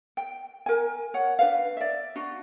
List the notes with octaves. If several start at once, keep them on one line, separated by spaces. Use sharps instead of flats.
G5
A#4 G#5
C#5 F#5
D4 B4 F5
D5 E5
D4 F#4